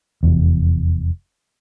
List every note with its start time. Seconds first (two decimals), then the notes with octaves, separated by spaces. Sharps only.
0.23 F1 E2